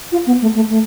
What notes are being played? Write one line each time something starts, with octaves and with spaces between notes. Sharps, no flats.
F4
B3
A3
A3
A3